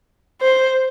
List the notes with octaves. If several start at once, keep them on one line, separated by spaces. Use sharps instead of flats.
C5